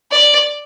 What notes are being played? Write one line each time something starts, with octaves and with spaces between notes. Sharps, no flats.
D5